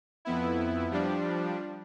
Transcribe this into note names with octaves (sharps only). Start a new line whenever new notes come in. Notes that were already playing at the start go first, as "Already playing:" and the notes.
F2 B3 E4
F3 G3 D4